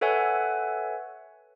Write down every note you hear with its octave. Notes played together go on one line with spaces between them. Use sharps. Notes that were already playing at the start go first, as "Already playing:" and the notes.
A4 B4 C#5 E5 F#5 G#5